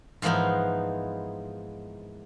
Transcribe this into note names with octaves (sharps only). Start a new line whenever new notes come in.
G#2 E3 F3 A#3 B3 D#4